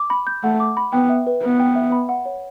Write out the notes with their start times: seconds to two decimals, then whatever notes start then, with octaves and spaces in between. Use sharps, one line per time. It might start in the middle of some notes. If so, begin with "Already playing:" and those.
Already playing: D6
0.10 B5
0.27 G6
0.43 A3 F#5
0.60 D6
0.77 B5
0.93 B3 G5
1.09 E5
1.27 B4
1.43 B3 B4
1.60 G5
1.75 E5
1.92 B5
2.09 F#5
2.26 C#5